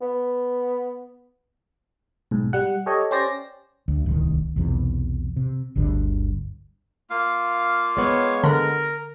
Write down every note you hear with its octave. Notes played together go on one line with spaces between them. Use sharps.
B3
B1 G#2
G3 F#5
G4 A4 C#5 D#5
C#4 G4 C5 D5 A#6
D2
D1 C2 D#3
B1 E2 C3
C3
G1 D2 G2 D3
A#3 F4 F5
G#3 B3 C#5
D3 A#4